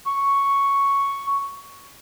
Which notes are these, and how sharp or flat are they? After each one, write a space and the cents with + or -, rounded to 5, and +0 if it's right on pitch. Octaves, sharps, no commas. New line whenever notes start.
C#6 +0